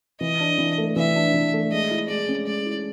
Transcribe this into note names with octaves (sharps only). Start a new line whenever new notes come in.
E3 D#5
D4
E3
A3
E3 E5
D4
E3
A3
G#3 D#5
E4
G#3 D5
C#4
G#3 D5
E4